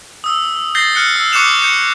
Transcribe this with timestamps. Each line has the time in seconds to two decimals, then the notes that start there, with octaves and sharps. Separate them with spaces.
0.24 D#6 E6
0.75 G6 A6 A#6 C7 G7
0.94 F6 F#6 C#7 G7
1.16 E6
1.32 C#6 D6 F#6 C#7 E7 F7
1.62 G6 C#7